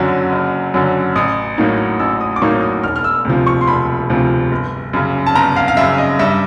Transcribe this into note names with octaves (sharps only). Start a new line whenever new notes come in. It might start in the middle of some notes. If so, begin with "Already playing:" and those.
Already playing: F#1 F#2 D3 F#3
F#1
F#2 D3 F#3
A1 D#6
A2 F#3 A#3 D#4
A1 E6
D#6
D6
A2 F#3 A#3 D#4 C#6
D#6
E1 F6
F6
E6
D2 C3 F3
C#6
C6
E1 B5
D2 C3 F3
G1
F#2 C#3
A5
G1 A#5
F5
F5
F#2 C#3 E5
D#5
G2 E5